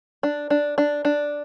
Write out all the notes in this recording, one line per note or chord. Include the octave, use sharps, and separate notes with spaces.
D4
D4
D4
D4